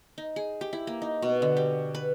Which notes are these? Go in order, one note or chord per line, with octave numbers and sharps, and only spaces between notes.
D#4
G#4
G4
E4
A#3
D#4
B2
D3
G4
B4